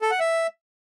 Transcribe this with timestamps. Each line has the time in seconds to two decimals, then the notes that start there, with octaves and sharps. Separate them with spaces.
0.02 A4
0.11 F#5
0.20 E5